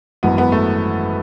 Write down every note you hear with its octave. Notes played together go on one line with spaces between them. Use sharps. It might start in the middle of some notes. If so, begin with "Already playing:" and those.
G#1 F#2 E3 B3
B3
A3